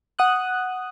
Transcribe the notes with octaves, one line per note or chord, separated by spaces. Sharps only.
F#5 D#6 F#6